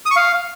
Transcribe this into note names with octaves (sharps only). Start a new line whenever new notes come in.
D#6
C#6
F5